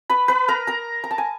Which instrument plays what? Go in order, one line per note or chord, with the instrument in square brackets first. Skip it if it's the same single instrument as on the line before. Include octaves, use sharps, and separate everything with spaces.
[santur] B4 B5
B4 B5
A#4 A#5
A#4 A#5
A#5
A5
G#5